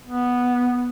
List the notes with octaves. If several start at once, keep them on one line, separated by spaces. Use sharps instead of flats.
B3